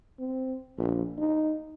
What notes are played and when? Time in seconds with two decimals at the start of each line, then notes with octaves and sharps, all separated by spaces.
0.19 C4
0.78 A#1
1.18 D#4